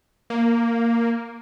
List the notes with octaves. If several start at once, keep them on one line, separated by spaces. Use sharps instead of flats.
A#3